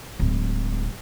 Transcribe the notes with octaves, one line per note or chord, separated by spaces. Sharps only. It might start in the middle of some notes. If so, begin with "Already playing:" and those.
D1 G#3